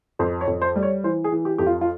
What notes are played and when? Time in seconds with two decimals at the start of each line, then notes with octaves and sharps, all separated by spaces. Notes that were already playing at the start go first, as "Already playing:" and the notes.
0.19 F2 C5
0.41 C#5
0.47 F2
0.62 C5
0.76 G3
0.83 C#5
1.04 E3 C5
1.24 G#4
1.32 E3
1.45 G4
1.58 F2 G4
1.66 F4
1.81 F4